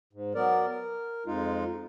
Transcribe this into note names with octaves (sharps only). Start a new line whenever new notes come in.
G#2
F#3 B3 A#4 D5
A#4
F2 G#3 D#4 F4